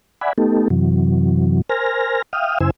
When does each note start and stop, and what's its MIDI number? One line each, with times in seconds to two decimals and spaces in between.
0.21 0.33 74
0.21 0.33 76
0.21 0.33 78
0.21 0.33 80
0.21 0.33 83
0.38 0.68 57
0.38 0.68 59
0.38 0.68 63
0.38 0.68 67
0.38 0.68 69
0.70 1.62 42
0.70 1.62 48
0.70 1.62 52
0.70 1.62 54
1.69 2.22 70
1.69 2.22 72
1.69 2.22 80
1.69 2.22 89
1.69 2.22 94
2.33 2.58 76
2.33 2.58 77
2.33 2.58 79
2.33 2.58 87
2.33 2.58 89
2.61 2.71 42
2.61 2.71 49
2.61 2.71 64
2.61 2.71 72
2.61 2.71 80
2.61 2.71 88